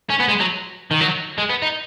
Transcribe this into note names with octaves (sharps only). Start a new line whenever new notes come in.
C#4
B3
G#3
F#3
D#3
F#3
G#3
B3
D#4